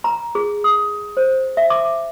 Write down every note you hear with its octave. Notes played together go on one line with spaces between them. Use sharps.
A#5
G#4
D#6
C5
E5
D6